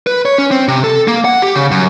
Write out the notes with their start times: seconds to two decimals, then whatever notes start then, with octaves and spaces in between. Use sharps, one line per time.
0.07 B4
0.25 C#5
0.38 C#4
0.51 C4
0.68 C3
0.84 A4
1.08 A#3
1.25 F#5
1.42 G4
1.56 C#3
1.71 F#2